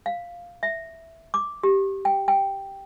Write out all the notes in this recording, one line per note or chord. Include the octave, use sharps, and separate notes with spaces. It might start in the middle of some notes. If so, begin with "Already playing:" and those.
F5
E5
D6
G4
G5
G5